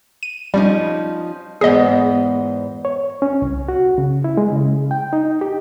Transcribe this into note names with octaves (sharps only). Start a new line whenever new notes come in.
D#7
F3 G3 C#4 D#4
E2 G#2 B3 G#4 D#5
C#5
C#4
C2
F#4
C#3
E4
G#3
C#3
G5
D#4
G4